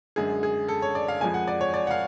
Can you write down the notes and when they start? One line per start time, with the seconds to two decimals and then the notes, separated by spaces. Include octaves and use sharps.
0.16 F#2 D3 G#3 G#4
0.43 G#4
0.68 A4
0.82 C#5
0.95 D5
1.08 F5
1.21 F2 F3 G#3 G#5
1.34 F#5
1.47 D5
1.61 C#5
1.74 D5
1.87 F#5
1.91 F5